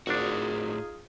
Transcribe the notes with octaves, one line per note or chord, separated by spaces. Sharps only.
G#1 A2 D4 D#4 F4 F#4 G#4